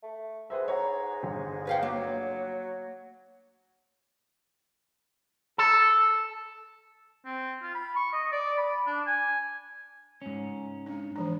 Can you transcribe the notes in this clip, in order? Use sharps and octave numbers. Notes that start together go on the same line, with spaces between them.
A3
G#2 B4 C5 E5
C#5 F#5 A#5
G1
B4 F5 G5
F#3 A#3
A4
C4
F4
B5
C#6
D#5
D5
B5
D4
G#5
G#2 C#4
G#3 D4
E3 F3 D4